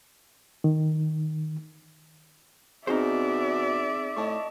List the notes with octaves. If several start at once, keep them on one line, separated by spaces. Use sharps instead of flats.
D#3
B2 C4 D#4 G#4 C5 D5 E5
A2 D#5 A5 C#6